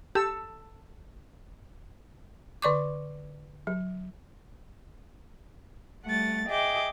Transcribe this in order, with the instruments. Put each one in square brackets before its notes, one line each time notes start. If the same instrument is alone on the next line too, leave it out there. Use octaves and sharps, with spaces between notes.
[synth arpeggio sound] G4 [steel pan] A4 A5 E6
[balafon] D3 D5 C#6 D6
F#3
[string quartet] G3 A3 F#5 A6
G#4 D#5 E5 G5 D6 G6